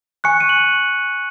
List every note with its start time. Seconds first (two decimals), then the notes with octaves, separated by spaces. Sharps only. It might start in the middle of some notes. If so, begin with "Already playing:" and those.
0.24 G#5 C#6 F#6 C#7
0.40 D#7
0.49 F#7